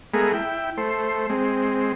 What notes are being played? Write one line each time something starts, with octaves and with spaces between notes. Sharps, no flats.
G#3 A3 B3 G#4 A#4
E4 G5
A3 C5
G#3 C4